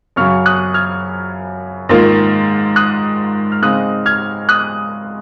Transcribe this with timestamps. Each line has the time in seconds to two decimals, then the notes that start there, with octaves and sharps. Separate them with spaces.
0.16 F#2 C#3 F#3 C#6 F6
0.46 D#6 F#6
0.74 F6 G#6
1.89 G#2 D#3 A#3 F4
2.76 D#6 F#6
3.52 F6
3.62 C#3 G#3 C4 D#4 D#6 F#6
4.06 F6 G#6
4.49 D#6 F#6